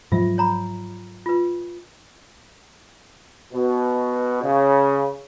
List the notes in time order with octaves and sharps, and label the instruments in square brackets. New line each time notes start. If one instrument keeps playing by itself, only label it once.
[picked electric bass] G#2 F3 F#3 [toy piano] F4 E5
[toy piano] C#5 A#5 B5
F4 B4
[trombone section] B2
C#3